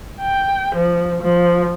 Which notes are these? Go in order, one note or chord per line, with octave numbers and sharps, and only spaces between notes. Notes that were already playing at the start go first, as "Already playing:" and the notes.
G5
F3
F3